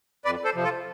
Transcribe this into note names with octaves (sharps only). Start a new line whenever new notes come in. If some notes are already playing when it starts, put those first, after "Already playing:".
F2 B4 D5
A4 C5
C3 F3
F4 A4